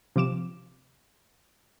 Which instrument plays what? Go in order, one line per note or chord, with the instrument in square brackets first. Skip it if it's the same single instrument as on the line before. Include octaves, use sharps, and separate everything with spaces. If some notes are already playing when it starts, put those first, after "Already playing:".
[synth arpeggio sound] C3 F3 D6 E7